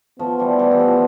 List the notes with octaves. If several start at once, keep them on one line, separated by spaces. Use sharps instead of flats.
F3 A3 B3
E3 G3
E3 G3
E3
F3